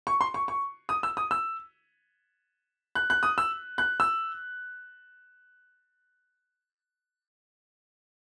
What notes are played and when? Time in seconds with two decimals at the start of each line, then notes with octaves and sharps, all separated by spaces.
0.07 C#6
0.21 C6
0.34 C#6
0.48 C#6
0.89 D#6
1.03 E6
1.17 D#6
1.31 E6
2.95 F#6
3.10 F#6
3.23 D#6
3.38 E6
3.78 F#6
4.00 E6